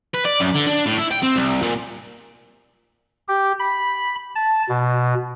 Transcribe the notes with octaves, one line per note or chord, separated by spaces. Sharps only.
B4
D5
F#2
D3
D4
A2
E4
G5
C4
C2
A#2
G4
B5
A5
B2